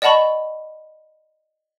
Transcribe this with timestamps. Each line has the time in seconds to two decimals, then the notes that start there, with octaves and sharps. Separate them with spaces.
0.02 D5 D#5 F#5 A5 B5 C#6